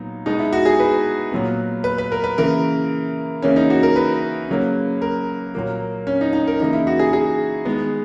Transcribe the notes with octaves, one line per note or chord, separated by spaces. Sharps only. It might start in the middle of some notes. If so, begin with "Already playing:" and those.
Already playing: A#2 F#3 B3 D#4
B2 G#3 B3 D#4
E4
F#4
G#4
B4
A#2 F#3 B3
B4
B4
A#4
B4
C#3 E3 A#3 A#4
C#3 E3 A#3 C#4
D#4
F#4
A#4
B4
C#3 F#3 A#3
A#4
A#2 F#3 A#3
C#4
D#4
D#4
A#4
C#3 E3 A#3 D#4
E4
F#4
G#4
G#4
D#3 G#3 B3